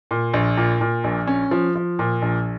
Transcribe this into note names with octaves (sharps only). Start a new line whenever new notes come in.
A#2
A#1
A#2
A#2
A#1
C#4
F3
F3
A#2
A#1